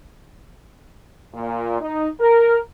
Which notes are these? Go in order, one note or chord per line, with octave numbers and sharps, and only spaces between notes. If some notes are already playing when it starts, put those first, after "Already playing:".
A#2
D#4
A#4